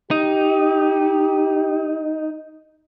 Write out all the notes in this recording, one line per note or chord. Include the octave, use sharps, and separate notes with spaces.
D#4 G4